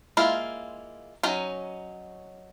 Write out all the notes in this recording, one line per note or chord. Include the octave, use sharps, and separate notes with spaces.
G#3 A#3 E4 F4
F#3 C#4 D#4